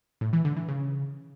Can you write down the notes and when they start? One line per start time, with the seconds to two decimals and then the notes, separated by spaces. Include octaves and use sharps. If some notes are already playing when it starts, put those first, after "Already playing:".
0.21 A2
0.33 E3
0.45 D3
0.57 E3
0.68 C#3